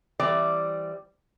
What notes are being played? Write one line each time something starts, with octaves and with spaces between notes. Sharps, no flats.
E3 G3 C4 D5